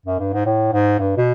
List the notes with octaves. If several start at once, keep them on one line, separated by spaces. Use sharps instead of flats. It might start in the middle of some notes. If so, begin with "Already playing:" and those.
F#2
G2
G#2
A2
G#2
G2
B2